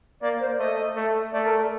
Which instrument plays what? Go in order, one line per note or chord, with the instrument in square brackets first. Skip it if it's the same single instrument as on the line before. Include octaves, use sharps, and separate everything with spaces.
[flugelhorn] A#3 [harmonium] D5
[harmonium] C5
[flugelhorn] A3 [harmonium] D#5
[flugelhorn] A3
[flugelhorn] A3 [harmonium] D5
[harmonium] A#4
A4